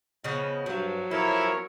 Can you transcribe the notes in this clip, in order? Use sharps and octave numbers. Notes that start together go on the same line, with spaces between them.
C#3 F3 B3 D#5
G2 F3 F#3
F3 E4 A4 A#4 C#5